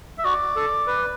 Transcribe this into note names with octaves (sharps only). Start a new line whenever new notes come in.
E5
F#4 D5
A4
B4